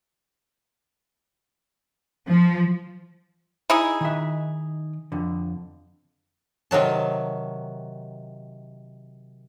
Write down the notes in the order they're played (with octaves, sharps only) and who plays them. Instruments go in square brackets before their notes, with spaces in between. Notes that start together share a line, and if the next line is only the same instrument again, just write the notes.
[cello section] F3
[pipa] D#4 E4 G#4
[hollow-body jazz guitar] D#3 E5
F2 D3
[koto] C3 D#3 F#3 A5